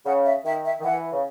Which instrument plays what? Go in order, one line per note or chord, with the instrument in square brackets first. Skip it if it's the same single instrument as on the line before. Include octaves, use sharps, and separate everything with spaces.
[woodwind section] C#3 [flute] F#5
[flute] E5
[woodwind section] D#3 [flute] E5
[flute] E5
[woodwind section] D#3
[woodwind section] E3 [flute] F#5
[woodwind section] C#3